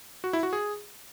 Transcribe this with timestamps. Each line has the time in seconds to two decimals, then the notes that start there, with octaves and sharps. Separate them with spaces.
0.24 F#4
0.33 E4
0.43 F#4
0.53 G#4